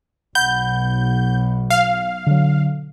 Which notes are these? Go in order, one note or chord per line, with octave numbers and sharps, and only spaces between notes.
B1 F#5 B5 G6
F5
D3 F#3